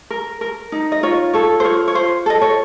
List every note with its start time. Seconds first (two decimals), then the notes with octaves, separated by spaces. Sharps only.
0.10 A#4
0.41 A#4
0.72 D#4
0.92 D#5
1.03 F4 C#5
1.33 A4 C#5
1.60 C5
1.64 F4 C#5
1.88 C#5
1.95 F4 C5
2.26 A4 D#5
2.42 C#5